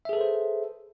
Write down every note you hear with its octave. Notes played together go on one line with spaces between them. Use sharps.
G#4 A4 B4 C5 E5